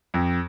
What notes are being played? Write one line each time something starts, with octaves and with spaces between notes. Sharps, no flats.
F2